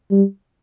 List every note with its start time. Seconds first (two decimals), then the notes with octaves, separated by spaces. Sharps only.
0.11 G3